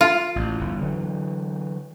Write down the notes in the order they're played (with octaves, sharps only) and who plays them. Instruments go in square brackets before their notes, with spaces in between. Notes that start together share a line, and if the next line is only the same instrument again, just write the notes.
[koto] F4
[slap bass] A1
G1 E2
D3 E3 F#3